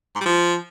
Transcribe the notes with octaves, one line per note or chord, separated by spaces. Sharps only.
G#2
G3
F3